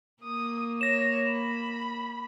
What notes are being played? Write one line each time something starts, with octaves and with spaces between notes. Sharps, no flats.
A#3 D#6
C#5 A#6 E7
B5